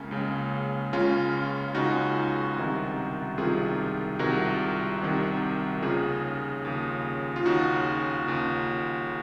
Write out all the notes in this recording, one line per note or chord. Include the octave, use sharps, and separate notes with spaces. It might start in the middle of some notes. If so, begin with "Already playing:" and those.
Already playing: C#2 C#3 A#3 C#4
C#2 C#3
C#2 C#3 C#4 F4
C#2 C#3 D#4 F#4
C2 C3 D#3
C2 C3 D#3 F4 G#4
C2 C3 D#3 F#4 A#4
C2 C3 D#3
D#2 C#3 F4 G#4
D#2 C#3
F4
D#2 C#3 D#4 F#4
D#2 C#3